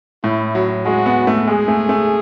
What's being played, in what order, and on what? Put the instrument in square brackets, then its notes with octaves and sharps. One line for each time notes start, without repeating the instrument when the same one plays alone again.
[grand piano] A2 [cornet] E4
[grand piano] F#3
[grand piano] G#3 [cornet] F#4
[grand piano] B3
A3
[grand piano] G#3 [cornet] G#4
[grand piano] A3
A3